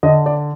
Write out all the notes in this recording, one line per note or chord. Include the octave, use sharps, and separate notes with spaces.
D3 D#5
D5